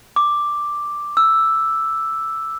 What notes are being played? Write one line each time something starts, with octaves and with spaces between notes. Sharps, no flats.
D6
E6